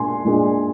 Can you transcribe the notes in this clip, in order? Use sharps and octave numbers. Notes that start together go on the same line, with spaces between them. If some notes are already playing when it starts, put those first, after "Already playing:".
Already playing: A#2 G#3 D4 G#5 C6
A#2 G#3 D4